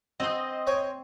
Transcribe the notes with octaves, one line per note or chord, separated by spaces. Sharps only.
C4 C5 D#5
C#5 G5 G#5